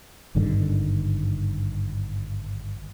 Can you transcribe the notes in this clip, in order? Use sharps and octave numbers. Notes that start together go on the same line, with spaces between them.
G#1 G2 D3 D#3